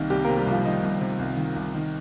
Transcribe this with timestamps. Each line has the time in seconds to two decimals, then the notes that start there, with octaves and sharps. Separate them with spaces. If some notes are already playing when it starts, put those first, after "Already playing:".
Already playing: C2 C3 D#3 A#3
0.10 C2 G3 G4
0.24 C3 A#3 A#4
0.38 G3 G4
0.47 C2 F3 F4
0.65 D#3 D#4
0.83 C2
1.01 C3
1.19 C2
1.37 D#3
1.56 C2
1.74 D#3